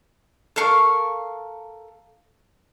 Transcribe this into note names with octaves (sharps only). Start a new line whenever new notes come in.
A4 A#4 F5 C#6